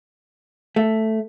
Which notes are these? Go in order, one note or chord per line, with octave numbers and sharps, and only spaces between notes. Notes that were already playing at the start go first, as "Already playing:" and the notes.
A3